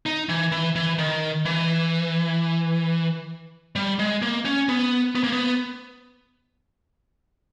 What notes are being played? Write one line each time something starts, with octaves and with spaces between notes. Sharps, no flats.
D#4
E3
E3
E3
D#3
E3
G3
G#3
A#3
C#4
B3
B3
A#3
B3